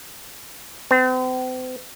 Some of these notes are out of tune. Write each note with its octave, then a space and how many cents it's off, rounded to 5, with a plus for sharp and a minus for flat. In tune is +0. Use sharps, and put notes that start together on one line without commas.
C4 -40